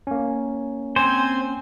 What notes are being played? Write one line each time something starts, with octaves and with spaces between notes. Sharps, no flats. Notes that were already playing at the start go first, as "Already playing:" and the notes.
A#3 C#4
C4 C5 G#5